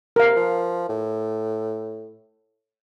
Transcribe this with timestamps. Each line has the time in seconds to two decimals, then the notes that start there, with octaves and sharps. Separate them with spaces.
0.16 C3 A#4 F5
0.35 F3
0.89 A2